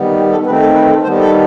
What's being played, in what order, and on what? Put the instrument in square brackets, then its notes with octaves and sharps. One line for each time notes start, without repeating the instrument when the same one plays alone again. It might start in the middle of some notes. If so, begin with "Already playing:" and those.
Already playing: [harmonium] D#3 G3 B3
G4
A4
D#3 A3 C4 B4
A4
B4
A4
D#3 G3 B3 C5
A4